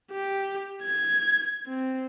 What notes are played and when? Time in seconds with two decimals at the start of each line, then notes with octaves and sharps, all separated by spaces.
0.11 G4
0.83 G#6
1.66 C4